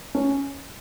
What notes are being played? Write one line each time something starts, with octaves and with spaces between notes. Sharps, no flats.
C#4